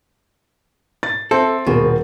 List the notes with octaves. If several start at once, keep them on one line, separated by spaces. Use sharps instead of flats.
A6
C4 A4 E5
D#1 B2 A#3 F#4 G#4 A#4